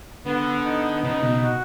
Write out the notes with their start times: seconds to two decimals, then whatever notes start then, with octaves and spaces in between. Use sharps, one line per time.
0.25 D3 B3
0.65 D#4
1.03 C#3 D#4
1.23 B2
1.43 F#4